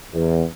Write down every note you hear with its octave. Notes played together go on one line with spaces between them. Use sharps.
E2